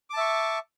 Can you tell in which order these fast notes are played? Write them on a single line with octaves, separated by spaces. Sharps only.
D6 A5 E5 C#6